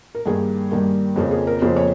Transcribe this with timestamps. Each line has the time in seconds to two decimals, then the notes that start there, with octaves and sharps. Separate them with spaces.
0.15 A#4
0.26 G2 D#3 G3 A#3 G#4
0.71 G2 D#3 G3 A#3
1.16 F2 C#3 F3 A#3
1.31 G#4
1.47 A#4
1.61 F2 C#3 F3 A#3 C5
1.77 C#5